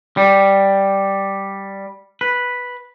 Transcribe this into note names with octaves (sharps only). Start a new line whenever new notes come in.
G3
B4